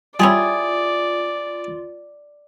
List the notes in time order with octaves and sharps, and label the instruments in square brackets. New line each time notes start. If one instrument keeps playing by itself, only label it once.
[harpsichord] G3 C#4 [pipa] E4 G4 G#4 [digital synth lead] F4 [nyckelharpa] D5